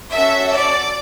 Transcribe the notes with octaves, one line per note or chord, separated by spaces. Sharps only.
C#4 F#4 A4 E5
D5